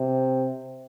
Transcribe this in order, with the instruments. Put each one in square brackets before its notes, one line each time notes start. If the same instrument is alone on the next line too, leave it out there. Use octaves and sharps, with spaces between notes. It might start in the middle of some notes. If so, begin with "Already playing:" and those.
Already playing: [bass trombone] C3